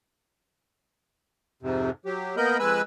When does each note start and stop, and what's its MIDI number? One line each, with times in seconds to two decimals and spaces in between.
1.62 1.90 41
1.62 1.90 44
1.62 1.90 48
2.06 2.36 54
2.06 2.36 67
2.37 2.57 58
2.37 2.57 59
2.37 2.57 70
2.37 2.57 75
2.37 2.57 83
2.37 2.57 91
2.59 2.82 41
2.59 2.82 56
2.59 2.82 71
2.59 2.82 80
2.59 2.82 83
2.59 2.82 88